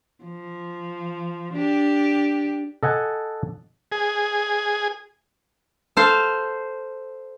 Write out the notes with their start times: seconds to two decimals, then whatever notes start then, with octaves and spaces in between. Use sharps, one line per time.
0.24 F3
1.53 D4 G4
2.83 A4 D#5 F#5 G#5 A5
3.92 G#4
5.97 A4 C5 F5